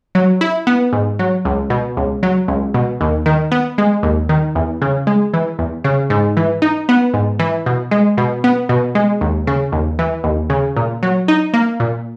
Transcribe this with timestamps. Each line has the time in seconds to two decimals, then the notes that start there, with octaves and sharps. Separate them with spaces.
0.15 F#3
0.41 E4
0.67 B3
0.93 G#2
1.19 F#3
1.45 C#2
1.70 B2
1.97 C#2
2.23 F#3
2.48 C#2
2.74 B2
3.01 D#2
3.26 D#3
3.52 B3
3.78 G#3
4.03 D#2
4.29 D#3
4.55 E2
4.82 C#3
5.07 G#3
5.34 E3
5.59 E2
5.84 C#3
6.10 G#2
6.37 E3
6.62 D#4
6.89 B3
7.14 G#2
7.39 E3
7.66 B2
7.91 G#3
8.18 B2
8.44 B3
8.69 B2
8.95 G#3
9.21 D#2
9.47 C#3
9.72 D#2
9.99 E3
10.24 D#2
10.50 C#3
10.76 A#2
11.03 F#3
11.28 D#4
11.54 A#3
11.80 A#2